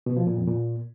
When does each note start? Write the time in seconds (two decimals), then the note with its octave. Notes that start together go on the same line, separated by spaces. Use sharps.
0.06 B2
0.17 F3
0.27 A#2
0.37 F2
0.47 A#2